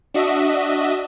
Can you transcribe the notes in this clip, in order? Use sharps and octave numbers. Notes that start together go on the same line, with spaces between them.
D4 F#4 D#5 E5